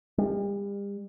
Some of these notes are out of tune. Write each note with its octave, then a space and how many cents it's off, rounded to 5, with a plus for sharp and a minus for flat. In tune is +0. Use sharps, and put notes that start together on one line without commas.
G3 +40